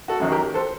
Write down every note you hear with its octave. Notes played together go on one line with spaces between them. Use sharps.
F#4 A4
F#2 D#3 F#3
G4 A#4
A4 C5